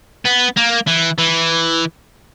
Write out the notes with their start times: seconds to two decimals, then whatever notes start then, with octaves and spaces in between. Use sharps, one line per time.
0.25 B3
0.57 A#3
0.87 E3
1.18 E3